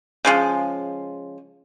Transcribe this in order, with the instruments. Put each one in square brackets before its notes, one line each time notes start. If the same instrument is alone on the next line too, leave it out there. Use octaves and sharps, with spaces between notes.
[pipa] C#3 F3 G#3